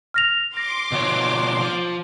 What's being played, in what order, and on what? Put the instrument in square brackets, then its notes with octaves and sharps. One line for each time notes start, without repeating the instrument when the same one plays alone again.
[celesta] F6 A#6 F7
[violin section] C6 D6 [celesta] A#6
[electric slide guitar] B2 F3 C#5
F3